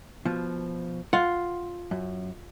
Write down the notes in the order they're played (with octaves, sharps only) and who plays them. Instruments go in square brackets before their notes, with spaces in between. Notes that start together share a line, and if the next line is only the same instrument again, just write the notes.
[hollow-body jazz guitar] B2 F3
[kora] F4 [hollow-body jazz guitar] F#5
[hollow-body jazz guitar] F#2